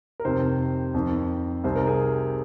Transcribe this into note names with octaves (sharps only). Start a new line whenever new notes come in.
A#4
F2 C3 D#3 C5
F2 D#3
C2 C3 D#3 C5
A#4
G#4